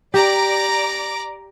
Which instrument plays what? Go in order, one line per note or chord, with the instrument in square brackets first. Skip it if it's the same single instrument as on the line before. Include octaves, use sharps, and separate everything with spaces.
[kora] G4 [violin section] D5 A#5 D6